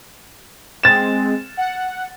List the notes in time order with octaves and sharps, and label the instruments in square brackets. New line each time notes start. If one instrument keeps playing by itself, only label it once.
[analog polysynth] G#3 C4 [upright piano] A6 E7
[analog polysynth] F#5